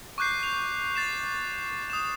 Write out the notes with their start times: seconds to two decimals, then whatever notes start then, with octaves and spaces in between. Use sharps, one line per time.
0.18 C#6 D6 F#6 G6 C7
0.43 F7
0.95 A6 C7 E7
1.90 D#6 E7